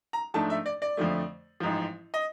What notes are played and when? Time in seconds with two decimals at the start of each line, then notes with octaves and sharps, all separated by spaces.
0.13 A#5
0.34 G#2 F3 A3 D4 A5
0.50 E5
0.66 D5
0.82 D5
0.97 F2 D3 F3 A3
1.60 A1 G#2 F3
2.14 D#5